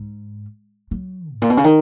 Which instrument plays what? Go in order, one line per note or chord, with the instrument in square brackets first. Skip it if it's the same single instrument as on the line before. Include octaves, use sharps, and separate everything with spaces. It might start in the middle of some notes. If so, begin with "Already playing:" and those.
Already playing: [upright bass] G#2
F#3
G#2
A#2
B2
C#3
D#3